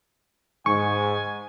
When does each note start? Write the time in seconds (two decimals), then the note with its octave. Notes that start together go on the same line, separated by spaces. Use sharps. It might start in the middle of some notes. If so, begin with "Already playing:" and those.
0.66 G#2 G#5 C#6